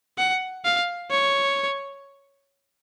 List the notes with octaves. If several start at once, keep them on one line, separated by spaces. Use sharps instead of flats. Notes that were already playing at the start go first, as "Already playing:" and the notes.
F#5
F5
C#5